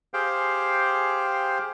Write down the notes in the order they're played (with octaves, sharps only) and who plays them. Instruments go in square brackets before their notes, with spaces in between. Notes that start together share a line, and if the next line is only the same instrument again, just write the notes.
[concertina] G4 G#4 C5 F5 G5